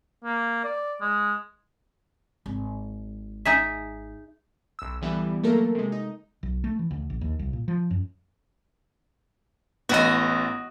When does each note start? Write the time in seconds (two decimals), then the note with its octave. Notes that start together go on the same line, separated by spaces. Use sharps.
0.24 A#3
0.64 D5
1.01 G#3
2.46 G#1
3.45 D#4 G#4 E5
4.79 B1 E6
5.02 D3 E3 G3 B3 E4
5.43 F#3 A3 A#3 A4 A#4
5.75 C3 G#3
5.92 D#4
6.43 B1
6.64 A3
6.79 E3
6.91 D2
7.10 A#1
7.21 D#2
7.39 C2
7.53 A#2
7.68 F3
7.91 F#2
9.89 A1 B3 F#4 D#5